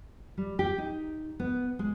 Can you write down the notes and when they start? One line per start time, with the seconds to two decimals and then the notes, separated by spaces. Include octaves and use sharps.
0.38 G3
0.59 G4
0.78 D#4
1.40 B3
1.79 G#3